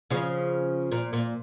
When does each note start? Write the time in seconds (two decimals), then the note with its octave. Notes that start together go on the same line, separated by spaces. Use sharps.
0.10 C#3 F3
0.92 A#2
1.13 A#2